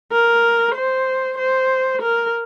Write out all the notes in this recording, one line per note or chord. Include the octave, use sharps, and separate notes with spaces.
A#4
C5
C5
A#4